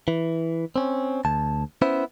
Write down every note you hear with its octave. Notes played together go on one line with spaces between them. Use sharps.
E3
C4 C#4
D2 A5
B3 C#4 E4 C5